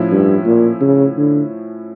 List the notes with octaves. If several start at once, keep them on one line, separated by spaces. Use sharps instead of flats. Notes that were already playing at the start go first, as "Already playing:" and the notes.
Already playing: A2 F3 C#4 E4
G2
A#2
C#3
D3